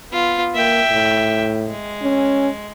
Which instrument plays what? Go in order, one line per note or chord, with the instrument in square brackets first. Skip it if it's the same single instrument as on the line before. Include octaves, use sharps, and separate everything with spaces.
[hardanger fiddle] B3 F4
[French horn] A#3 [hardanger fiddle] E5 G5
[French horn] A2
[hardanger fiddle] G#3
[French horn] C#4